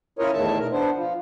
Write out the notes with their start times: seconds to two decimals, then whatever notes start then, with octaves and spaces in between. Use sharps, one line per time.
0.19 C#4 E4 F4 A#4 C#5 D#5
0.33 E2 A2 D#3 E5 A5
0.59 B2 A#4
0.72 B3 D4 C5
0.95 F3